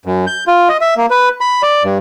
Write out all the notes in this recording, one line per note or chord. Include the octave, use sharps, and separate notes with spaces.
F#2
G6
F4
D#5
E5
A#3
B4
B5
D5
G2